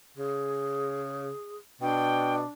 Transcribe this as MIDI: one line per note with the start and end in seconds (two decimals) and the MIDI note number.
0.17 1.30 49
0.17 1.56 68
1.81 2.42 47
1.81 2.48 62
1.81 2.35 79